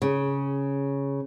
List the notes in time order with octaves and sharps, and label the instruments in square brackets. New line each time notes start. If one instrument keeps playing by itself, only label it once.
[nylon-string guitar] C#3